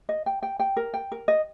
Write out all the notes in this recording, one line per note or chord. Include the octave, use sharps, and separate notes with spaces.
D#5
G5
G5
G5
A#4
G5
A#4
D#5